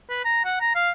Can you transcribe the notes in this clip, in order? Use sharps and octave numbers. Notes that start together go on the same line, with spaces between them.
B4
A#5
F#5
A#5
F5